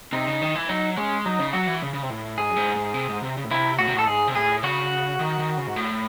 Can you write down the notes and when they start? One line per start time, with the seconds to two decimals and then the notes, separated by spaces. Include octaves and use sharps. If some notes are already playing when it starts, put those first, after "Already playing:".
0.13 C3 D#4
0.27 C#3
0.42 D#3
0.55 E3
0.69 F#3 D#4
0.97 G#3 C#4
1.25 F#3 D#4
1.39 C#3
1.53 F#3 F#4
1.67 E3
1.82 C#3
1.94 C#3
2.02 C3
2.10 A2
2.38 G#2 G#4
2.50 F#2
2.56 G#2
2.76 G#2
2.94 C3
3.09 G#2
3.23 C3
3.37 C#3
3.44 A2
3.50 C3 E4
3.79 A2 F#4
3.87 C3
3.94 A2 A4
4.07 G#2 G#4
4.27 C3
4.35 A2 G#4
4.63 C#3 F#4
5.20 D#3
5.39 D#3
5.57 C#3
5.67 G#2
5.76 A2